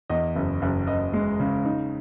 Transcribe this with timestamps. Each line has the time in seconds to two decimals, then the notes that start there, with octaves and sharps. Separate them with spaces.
0.10 E2 D#5
0.36 F#1
0.62 F#1
0.87 F#1 D#5
1.14 G#3
1.40 C#3
1.65 D#4